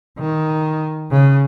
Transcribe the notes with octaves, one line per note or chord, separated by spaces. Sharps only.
D#3
C#3